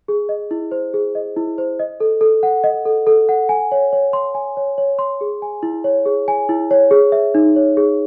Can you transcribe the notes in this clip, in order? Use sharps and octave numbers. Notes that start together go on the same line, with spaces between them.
G#4
D#5
E4
C5
G#4
D#5
E4
C5
D#5
A4
A4
F#5
D#5
A4
A4
F#5
G#5
C#5
C#5
C6
G#5
C#5
C#5
C6
G#4
G#5
E4
C#5
G#4
G#5
E4
C#5
G#4
E5
D#4
C#5
G#4